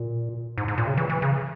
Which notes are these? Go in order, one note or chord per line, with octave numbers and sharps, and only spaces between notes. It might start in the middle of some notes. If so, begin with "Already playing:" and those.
Already playing: A#2
G#2
G#2
A#2
C#3
E3
E3
C#3